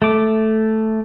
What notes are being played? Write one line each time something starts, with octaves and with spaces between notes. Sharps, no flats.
A3 D6